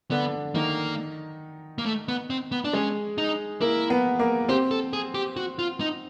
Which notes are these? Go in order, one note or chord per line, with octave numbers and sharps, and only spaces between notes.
D3 B3 D4
D#3 A#3 D#4
A#3
A3
B3
C4
B3
D4
G#3 C#4 G#4
D#4
A#3 E4 A#4
B3 B4
A#3 A#4
C4 G4 C5
A4
G#4
G4
F#4
F4
D#4